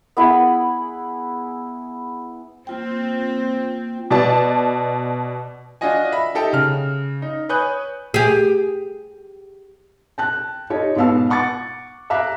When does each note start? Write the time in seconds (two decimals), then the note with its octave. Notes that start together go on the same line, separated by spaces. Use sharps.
0.17 B3 E4 G#4 B5
2.67 A#3 C4 F4 G5
4.11 B2 D5 A5
5.81 D4 F4 F#4 D#5 G#5
6.12 E5 B5
6.35 D#4 G4 A4 E5 G5
6.53 C#3 F6
7.22 D#4
7.49 B4 C#5 G#5 D#6 F#6 G6
8.14 G4 G#4
10.18 G5 A5 F#6
10.70 D#4 F4 G4 A4 C#5
10.96 G#2 B2 B3 F5 A5 E6
11.30 F#5 C#6 D6 A6
12.10 E5 F5 A#5 D6 F#6